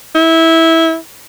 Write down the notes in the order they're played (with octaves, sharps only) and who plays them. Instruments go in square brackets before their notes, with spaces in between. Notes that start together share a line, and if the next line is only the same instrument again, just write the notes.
[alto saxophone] E4